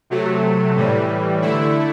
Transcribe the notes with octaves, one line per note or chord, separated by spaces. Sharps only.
C3 F#3 A3
A2 E3 G3
D3 A3 E4